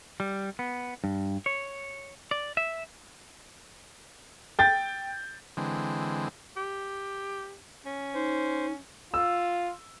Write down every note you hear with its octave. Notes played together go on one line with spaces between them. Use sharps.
G3
B3
G2
C#5
D5
E5
G5 G6 A6
D3 E3 G#3 C4
G4
C#4
D#4 C5
F4 E6